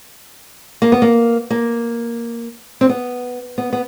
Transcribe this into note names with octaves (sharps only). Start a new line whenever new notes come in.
A#3
B3
A#3
A#3
C4
B3
B3
B3